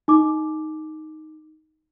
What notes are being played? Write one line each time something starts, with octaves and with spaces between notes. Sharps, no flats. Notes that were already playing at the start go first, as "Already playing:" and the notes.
D#4 D6